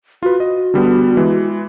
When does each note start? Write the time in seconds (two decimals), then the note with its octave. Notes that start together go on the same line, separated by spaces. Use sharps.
0.23 F4 F#4 B4
0.40 D#5
0.74 D3 G3 B3
1.17 E3 G#3